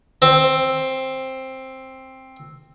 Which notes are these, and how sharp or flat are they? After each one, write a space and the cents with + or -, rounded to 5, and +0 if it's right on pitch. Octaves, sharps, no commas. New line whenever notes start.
C4 +10